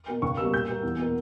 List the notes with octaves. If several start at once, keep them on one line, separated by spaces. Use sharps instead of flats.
B2 A#3
C#2 C#6
B2 G3 A#3 E6
A#2 G6
G3 A#3
E2
B2 A#3